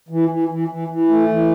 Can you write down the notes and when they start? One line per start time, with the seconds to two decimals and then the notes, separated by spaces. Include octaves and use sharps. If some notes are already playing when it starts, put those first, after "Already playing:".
0.09 E3
0.29 E3
0.48 E3
0.68 E3
0.88 E3
1.08 A3
1.28 E3